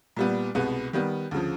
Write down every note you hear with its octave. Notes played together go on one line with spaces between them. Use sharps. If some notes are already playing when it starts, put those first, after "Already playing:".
A#2 G3 B3
C2 B2 G#3 B3
D#3 G3 B3
D2 C#3 F3